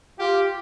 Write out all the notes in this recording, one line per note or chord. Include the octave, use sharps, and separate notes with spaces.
F4 G4